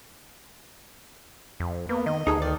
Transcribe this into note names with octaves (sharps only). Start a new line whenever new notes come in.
F2
A#3 B3
D#3 D#5
D2 D#4 G#4 A4
D#3 D5